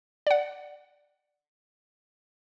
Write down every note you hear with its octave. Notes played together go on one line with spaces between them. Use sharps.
D5 F#5